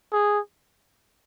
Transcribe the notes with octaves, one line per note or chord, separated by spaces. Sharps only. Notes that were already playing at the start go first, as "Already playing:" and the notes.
G#4